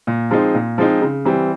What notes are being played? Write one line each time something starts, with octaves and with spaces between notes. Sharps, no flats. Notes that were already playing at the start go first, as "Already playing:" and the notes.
A#2
F3 G#3 C4 D#4
A#2
F3 G#3 C4 D#4
C#3
E3 G3 C4